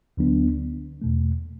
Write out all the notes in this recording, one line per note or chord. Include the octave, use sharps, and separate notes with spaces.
D2 D3 F#3 B3 D4
E2 B2 A3